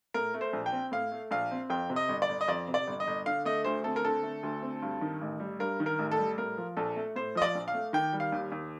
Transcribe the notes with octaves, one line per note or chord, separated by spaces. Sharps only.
A2 A#4
A3
C5
A#1
G5
C4
A2 F5
A3
A#1 F5
C4
F2 G5
C3
D#5
G1
D5
G1
D#5
F2 D5
C3
D5
G1
D#5
G1
D3 F5
A3 D#5
D2 C5
C4 A4
A#4
D3 A4
A3
D2
C4
G2
D#3
A1
G3
G2 A#4
D#3
A#4
A1
A4
G3
A2 A#4
F3
A#1 A4
A3
A2 C5
F3 D#5
D5
A#1
F5
A3
D#3 G5
G3
F5
D#2
D#2